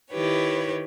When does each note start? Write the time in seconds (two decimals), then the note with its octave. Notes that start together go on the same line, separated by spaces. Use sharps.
0.11 D#3 E4 G4 B4 C#5